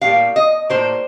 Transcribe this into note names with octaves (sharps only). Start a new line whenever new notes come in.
A2 G3 A#3 F5
D#5
A2 G3 A#3 C5